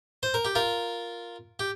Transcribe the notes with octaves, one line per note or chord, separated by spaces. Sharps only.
C5
A#4
G4
F4 A#4
G4